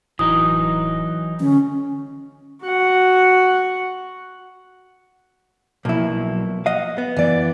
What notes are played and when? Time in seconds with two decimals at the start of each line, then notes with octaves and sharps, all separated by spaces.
0.19 D1 E3 F#3 D#4 D#6
1.41 D3 C#4
2.63 F#4 F#5
5.85 B1 F3 F#3 A#3 E4
6.66 D#5 F5 F#5
6.98 B3
7.16 E3 D5